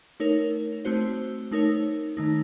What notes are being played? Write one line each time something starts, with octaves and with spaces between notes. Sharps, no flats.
A3 D#4 A#4 C#5
A3 C4 F#4 C5
A3 D#4 A#4 C#5
D#3 A3 D#4